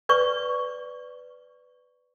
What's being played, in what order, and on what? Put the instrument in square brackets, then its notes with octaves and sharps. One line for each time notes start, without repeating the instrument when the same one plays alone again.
[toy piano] B4 D5 C#6